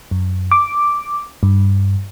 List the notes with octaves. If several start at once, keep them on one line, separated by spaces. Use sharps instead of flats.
F#2
D6
G2